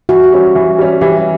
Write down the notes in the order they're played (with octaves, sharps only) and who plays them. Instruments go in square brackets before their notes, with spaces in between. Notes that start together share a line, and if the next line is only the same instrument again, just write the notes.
[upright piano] E3 [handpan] F#4
[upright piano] G3 C#4
E3
G3 C#4
[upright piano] E3 [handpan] G4